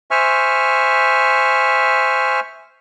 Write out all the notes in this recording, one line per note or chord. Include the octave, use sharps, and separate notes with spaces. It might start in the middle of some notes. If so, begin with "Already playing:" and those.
C5 E5 G#5 C#6 F6